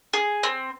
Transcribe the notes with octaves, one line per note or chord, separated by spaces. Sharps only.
G#4
C4